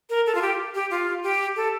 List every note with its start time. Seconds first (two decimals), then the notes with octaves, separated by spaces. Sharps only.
0.10 A#4
0.27 A4
0.35 F4
0.42 G4
0.75 G4
0.91 F4
1.23 G4
1.56 A4